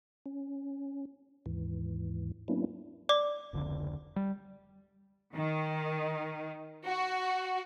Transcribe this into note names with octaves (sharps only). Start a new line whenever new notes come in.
C#4
D#2 G#2 E3
F#3 A#3 B3 C#4 D4 E4
D5 D6
F1 C#2 D3
G3
D#3
F#4